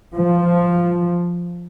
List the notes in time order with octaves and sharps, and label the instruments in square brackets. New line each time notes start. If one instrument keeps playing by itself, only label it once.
[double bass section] F3